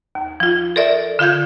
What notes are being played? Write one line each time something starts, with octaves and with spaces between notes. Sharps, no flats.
D#2
F3 F4
A4 A#4 D5 E5
D3 F4 F5 G6 G#6